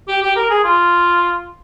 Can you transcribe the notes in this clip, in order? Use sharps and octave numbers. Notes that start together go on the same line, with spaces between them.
G4
G4
A#4
G#4
F4